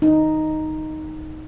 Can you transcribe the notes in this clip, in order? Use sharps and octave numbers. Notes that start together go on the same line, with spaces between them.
D#4